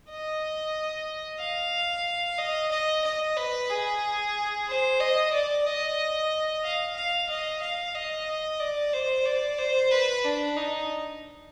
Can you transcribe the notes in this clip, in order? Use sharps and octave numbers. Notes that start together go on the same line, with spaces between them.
D#5
F5
D#5
D#5
D#5
B4
G#4
C5
D#5
D5
D#5
F5
F5
D#5
F5
D#5
D5
C5
D5
C5
B4
D4
D#4